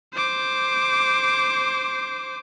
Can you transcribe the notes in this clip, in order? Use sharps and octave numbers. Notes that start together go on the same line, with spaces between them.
C5 D6